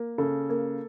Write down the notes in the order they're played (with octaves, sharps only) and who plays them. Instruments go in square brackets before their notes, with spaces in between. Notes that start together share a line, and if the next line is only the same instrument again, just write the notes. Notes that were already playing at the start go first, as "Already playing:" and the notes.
Already playing: [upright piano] A#3
C#3 A4
A#3